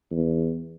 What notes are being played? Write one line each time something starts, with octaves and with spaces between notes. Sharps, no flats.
E2